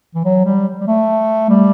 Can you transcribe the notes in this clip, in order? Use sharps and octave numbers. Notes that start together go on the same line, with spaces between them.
E3
F#3
G3
G3
A3
G3